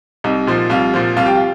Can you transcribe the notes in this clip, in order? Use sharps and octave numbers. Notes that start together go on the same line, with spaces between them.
C2 D#4
A#2 F3
C2 F4
A#2 F3
C2 F4
G4
F4